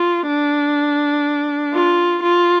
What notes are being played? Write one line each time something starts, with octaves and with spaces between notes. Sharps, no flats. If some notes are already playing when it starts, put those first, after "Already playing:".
Already playing: F4
D4
F4
F4